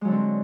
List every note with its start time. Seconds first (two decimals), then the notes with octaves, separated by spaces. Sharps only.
0.01 G#3
0.05 F#3
0.08 D3
0.11 C4